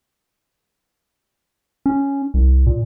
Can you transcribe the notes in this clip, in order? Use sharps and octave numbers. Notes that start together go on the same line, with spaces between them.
C#4
C2
A#2